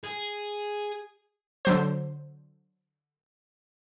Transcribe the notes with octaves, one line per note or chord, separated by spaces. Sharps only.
G#4
D3 F#3 C5